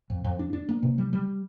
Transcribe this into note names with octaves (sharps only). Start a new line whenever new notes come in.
F2
F2
D4
D4
A#3
C3
G3
G3